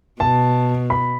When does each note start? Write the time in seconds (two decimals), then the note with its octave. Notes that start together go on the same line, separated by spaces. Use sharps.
0.20 B2 A5
0.90 B5